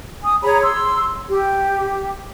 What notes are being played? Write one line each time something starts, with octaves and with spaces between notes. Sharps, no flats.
G#5 D#6
G#4 C#5 A#5 B5
C6 E6
G4